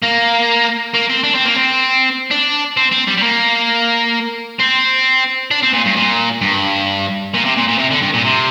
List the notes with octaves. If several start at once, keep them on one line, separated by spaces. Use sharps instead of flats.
A#3
A#3
C4
D4
C4
A#3
C4
D4
C4
C4
G3
G3
A#3
C4
D4
C4
A#2
G2
A#2
G2
A#2
C3
A#2
A#2
C3
D3
G2
A#2
C3